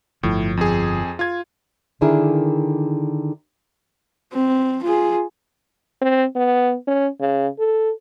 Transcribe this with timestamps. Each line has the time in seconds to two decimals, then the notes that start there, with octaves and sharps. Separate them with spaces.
0.23 G1 A2 F3
0.57 F2 G#4
1.19 F4 G#6
2.01 D3 D#3 D4 E4 G#4 A#4
4.33 C4
4.83 F4 G#4
6.02 C4
6.35 B3
6.87 C#4
7.20 C#3
7.59 A4